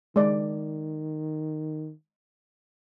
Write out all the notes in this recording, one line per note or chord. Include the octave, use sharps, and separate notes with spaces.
D#3 G#3 D5